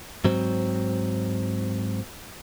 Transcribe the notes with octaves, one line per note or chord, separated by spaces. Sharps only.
G#2 F#3 C4